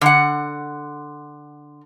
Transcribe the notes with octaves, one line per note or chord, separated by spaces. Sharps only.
D3 F#5